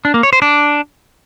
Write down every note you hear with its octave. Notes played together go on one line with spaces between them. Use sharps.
D4
A#3
C#5
C5
D4